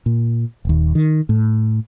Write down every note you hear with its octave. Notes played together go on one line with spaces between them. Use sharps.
A#2
D#1 D#2
D#3
A2